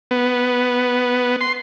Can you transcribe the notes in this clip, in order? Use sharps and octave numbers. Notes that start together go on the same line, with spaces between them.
B3
C6